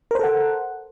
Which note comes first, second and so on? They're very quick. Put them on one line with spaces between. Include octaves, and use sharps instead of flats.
A#4 C5 A4 F#5